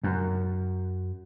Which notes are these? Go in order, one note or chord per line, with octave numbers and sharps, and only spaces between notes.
F#2